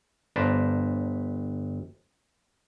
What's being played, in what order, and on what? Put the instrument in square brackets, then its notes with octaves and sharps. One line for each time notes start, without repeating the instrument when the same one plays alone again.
[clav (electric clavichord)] G1 B4 C5 D5 A5 A#5